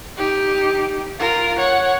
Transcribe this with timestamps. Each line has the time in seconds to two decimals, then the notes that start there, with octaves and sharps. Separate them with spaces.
0.18 D#4 G4
1.19 F4 A#4
1.59 C#5 F#5